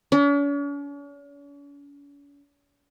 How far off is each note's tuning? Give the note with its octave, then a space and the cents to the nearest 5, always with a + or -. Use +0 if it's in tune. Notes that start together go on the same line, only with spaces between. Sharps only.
C#4 +45